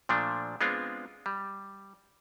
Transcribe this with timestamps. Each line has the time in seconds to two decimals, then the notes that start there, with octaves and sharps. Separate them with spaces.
0.09 A#2 F3 A3 D4
0.61 G#3 B3 C4 D4 F4
1.26 G3